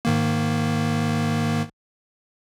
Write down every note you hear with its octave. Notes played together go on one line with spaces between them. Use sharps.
G#2 D#3 A#3